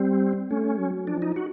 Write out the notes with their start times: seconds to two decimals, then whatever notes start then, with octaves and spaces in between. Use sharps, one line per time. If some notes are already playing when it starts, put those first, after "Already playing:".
Already playing: G3 C4
0.50 A3 C#4
0.79 F#3
1.07 F3 D4
1.22 D#4
1.36 F#4